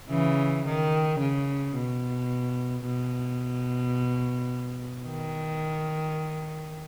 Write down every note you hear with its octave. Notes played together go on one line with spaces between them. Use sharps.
C#3 E3
D#3
C#3
B2
B2
D#3